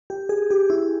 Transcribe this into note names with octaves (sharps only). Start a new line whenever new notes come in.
G4
G#4
G4
E4